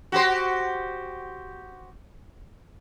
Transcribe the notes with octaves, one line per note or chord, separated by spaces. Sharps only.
F#4 G4 C5